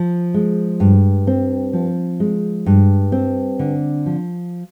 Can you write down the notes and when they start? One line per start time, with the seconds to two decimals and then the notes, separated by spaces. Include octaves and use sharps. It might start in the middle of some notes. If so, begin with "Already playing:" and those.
Already playing: F3
0.34 G#3
0.80 G2
1.27 C4
1.73 F3
2.20 G#3
2.66 G2
3.12 C4
3.59 D3
4.06 F3